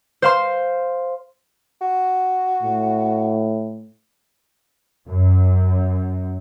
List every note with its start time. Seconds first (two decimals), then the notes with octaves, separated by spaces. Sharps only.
0.22 C5 F5 C6
1.81 F#4
2.63 A2
5.08 F#2